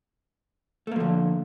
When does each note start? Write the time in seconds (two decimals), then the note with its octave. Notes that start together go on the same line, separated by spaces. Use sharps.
0.87 A3
0.92 A#3
0.96 F3
1.00 D3